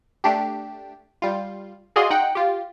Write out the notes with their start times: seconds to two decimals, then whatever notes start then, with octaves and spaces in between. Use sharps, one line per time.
0.24 A3 D4 G4
1.22 G3 F4
1.96 F#4 G#4 D5 D#5 F5 C6
2.10 D#4 F#5 G5
2.35 F4 G4